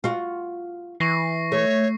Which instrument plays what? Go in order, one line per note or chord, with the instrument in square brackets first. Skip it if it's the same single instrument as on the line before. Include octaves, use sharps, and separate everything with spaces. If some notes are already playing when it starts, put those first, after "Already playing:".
[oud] F4 F#4
[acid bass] E3 [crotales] C#6 A#6 C7
[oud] A3 [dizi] C#5